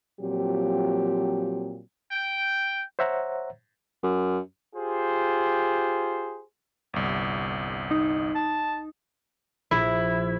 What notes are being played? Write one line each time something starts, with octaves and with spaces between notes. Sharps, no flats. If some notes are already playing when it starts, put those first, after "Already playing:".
A#2 F3 F#3 C4 G4
G5
C5 C#5 E5 F#5 A#5
F#2
F4 G4 G#4 C5
G1 C2
D#4
A5
A#1 E4